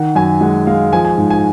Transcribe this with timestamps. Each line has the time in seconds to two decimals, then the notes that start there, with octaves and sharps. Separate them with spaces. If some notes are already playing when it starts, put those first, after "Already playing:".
Already playing: D#3 F#5
0.15 F#2 G#5
0.41 G#3 F#5
0.67 G#3 F5
0.93 F3 G#5
1.05 G#5
1.18 G#2
1.30 G#5